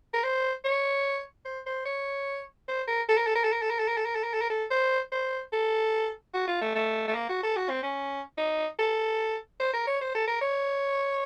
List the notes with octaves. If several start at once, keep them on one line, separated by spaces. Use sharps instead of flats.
A#4
C5
C#5
C5
C5
C#5
C5
A#4
A4
A#4
A4
A#4
A4
A#4
A4
A#4
A4
A#4
A4
A#4
A4
A#4
A4
A#4
A4
C5
C5
A4
F#4
F4
A3
A3
A3
A#3
F#4
A4
F#4
C4
C#4
D#4
A4
C5
A#4
C#5
C5
A4
A#4
C#5